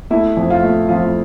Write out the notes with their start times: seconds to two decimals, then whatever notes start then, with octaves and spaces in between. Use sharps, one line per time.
0.10 A3 E4
0.37 F2
0.50 F4
0.63 A3
0.89 F2 F4